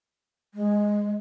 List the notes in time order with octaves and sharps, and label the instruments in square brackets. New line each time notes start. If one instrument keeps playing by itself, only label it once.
[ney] G#3